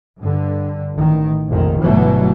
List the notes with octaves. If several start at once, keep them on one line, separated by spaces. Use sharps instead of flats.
G2 D3
A1 D#3
F1 A#1 F2 D#3
G1 B2 E3 F#3 A3